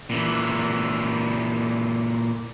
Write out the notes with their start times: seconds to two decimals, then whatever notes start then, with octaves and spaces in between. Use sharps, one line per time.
0.10 A#2 E3